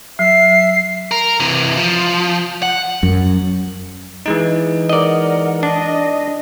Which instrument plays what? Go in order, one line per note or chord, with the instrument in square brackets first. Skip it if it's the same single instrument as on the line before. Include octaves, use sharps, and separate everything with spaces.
[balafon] F#3 [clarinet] E5 [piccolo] C7
[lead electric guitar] A#4
C3 E3
F3
F#5
[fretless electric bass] F#2
[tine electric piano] E3 G#3 D#4
[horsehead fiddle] A#4 F#5 [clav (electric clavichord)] D5 D#5
[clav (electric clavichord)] D4 [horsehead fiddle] D#5